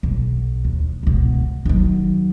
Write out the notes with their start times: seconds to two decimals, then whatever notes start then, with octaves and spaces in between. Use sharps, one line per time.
0.03 B1
0.65 D#2
1.03 C#2 B2
1.65 D#3 F#3